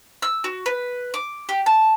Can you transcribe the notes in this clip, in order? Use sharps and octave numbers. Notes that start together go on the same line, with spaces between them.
E6
F#4
B4
D6
G4
A5